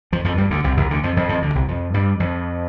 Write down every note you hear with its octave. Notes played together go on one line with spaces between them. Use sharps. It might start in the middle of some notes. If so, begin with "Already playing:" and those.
F2 F3
F2 F3
G2 G3
D2 D3
C2 C3
C2 C3
D2 D3
F2 F3
F2 F3
F2 F3
D2 D3
C2 C3
F2 F3
G2 G3
F2 F3